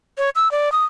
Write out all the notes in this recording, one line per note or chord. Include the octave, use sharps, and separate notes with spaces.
C#5
E6
D5
D#6